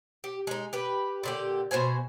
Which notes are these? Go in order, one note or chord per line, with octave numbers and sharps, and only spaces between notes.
G4
G#3 D#4
G4 B4
A#2 D3 G4
B2 F#4 C5 G#5